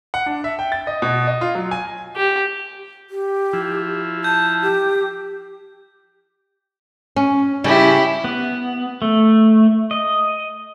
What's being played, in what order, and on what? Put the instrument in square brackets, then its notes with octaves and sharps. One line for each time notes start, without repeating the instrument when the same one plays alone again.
[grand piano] F#5
D4
E5
G5
A6
D#5
B2
D#5
F4
F#3
G#5
[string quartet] G4
[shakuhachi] G4
[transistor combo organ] F3 E4
[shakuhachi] A5 [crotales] G6
[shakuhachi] G4
[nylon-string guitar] C#4
[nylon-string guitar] C#3 G3 [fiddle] E4 G4
[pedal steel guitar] B3
A3
D#5